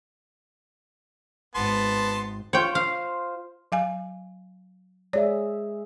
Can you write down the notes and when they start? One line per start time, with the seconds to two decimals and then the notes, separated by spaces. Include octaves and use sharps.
1.55 G#1 B3 A5 C6
2.53 F4 C5 C#5 G5
2.75 F5
3.72 F#3 F5 G#5
5.13 G#3 G#4 C#5 D5 E5